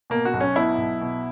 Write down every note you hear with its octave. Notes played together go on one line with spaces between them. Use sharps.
B2 A#3
F#4
B1
C#4
B2 E4
B1
B2